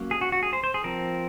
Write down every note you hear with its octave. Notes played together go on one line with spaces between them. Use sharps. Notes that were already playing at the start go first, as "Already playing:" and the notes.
Already playing: F#3 A#3 C#4
G#4
F#4
F#4
G#4
C5
C5
G#4
F3 C4 A#4